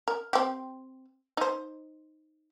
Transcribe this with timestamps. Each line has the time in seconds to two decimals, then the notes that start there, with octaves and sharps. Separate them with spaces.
0.08 A#4
0.33 C4 G4
1.37 D#4 C5